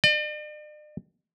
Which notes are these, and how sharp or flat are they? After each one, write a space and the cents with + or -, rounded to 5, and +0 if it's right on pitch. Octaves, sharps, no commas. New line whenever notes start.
D5 +45